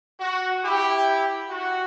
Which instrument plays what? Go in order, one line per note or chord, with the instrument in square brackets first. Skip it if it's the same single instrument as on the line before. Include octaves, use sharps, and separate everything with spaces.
[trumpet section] F#4
E4 G4
F#4